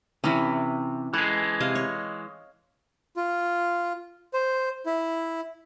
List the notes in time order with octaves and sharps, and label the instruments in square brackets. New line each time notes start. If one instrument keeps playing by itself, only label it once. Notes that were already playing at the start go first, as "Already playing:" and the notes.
[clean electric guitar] C3 [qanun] E3 C#4
[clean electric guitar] E3 G#3 [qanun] A4
[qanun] C3 D#5 F5
C#5
[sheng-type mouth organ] F4
C5
E4